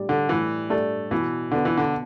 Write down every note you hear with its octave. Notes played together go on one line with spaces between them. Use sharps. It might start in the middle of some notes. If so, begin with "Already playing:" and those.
Already playing: A2 G3 D4 G4 D5
D3
A2 E3
G3 A3 D4 G4 D5
B2 E3
D3 B3 D4
E3
D3